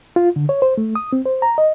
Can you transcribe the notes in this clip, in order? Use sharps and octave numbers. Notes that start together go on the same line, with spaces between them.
F4
D3
C#5
C5
A3
D#6
C4
C5
A#5
D#5